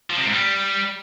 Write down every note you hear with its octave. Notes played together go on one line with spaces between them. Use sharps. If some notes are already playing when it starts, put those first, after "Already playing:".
F3
C3
G#2
G3